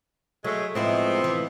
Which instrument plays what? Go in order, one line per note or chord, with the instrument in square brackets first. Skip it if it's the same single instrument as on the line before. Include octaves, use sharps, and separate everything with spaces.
[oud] F#3 [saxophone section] G#3 A3
[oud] A2 G#3 E4 [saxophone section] F3 B3 C4
[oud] E3